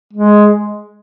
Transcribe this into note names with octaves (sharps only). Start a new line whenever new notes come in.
G#3